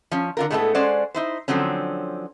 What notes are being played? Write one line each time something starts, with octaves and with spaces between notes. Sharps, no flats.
F3 C#4
D3 F4 A#4
A2 G#3 A3 B3 E4 A4
G#3 C#4 C5 D5 F#5
D#4 E4 C5
D3 F3 F#3 C4 C#4